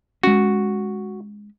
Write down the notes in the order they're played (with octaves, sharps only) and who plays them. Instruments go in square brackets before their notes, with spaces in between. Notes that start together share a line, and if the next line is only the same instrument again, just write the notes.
[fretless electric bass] G#3 C#4 [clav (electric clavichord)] F#4